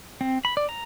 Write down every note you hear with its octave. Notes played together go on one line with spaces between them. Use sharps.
C4
B5
D5
A#5